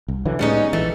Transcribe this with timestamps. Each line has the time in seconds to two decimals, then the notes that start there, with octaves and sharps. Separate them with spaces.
0.08 C2
0.25 D3 E3 F#3
0.39 A2 G3 G#3 B3 C#4 D#4
0.73 A#1 E3 A3